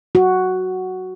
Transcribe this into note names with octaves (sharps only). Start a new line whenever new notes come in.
F#4